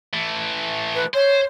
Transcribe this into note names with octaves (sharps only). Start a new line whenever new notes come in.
E3 A3
B4
C5 C#5